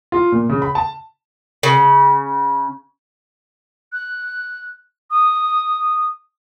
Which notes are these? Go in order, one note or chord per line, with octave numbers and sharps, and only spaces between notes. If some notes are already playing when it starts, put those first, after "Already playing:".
F4
A#2
C#3
B5
A5
C#3
F#6
D#6